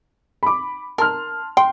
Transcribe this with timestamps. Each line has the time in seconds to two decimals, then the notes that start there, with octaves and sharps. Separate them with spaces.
0.43 B5 D6
0.98 A#4 A5 C6 F6
1.57 G5 C6